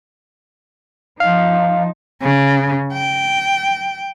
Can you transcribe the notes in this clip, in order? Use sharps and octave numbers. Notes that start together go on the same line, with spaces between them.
F3 D#4 F5
C#3
G5